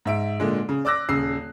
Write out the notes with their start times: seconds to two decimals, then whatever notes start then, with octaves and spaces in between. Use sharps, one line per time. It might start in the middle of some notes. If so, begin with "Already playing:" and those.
0.05 G#2 E5 D7
0.40 A#2 D3 G#3
0.69 C#3
0.85 D5 D6 E6 F#6 A#6
1.09 D#1 C#3 E6 C7